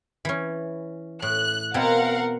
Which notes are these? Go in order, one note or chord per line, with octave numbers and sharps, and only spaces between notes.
E3 C#4
A2 F#6
B2 C4 E4 A#4 F5 F#5